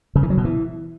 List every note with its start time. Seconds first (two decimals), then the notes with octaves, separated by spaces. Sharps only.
0.15 C#3
0.23 E3
0.30 F#3
0.37 B2
0.45 E3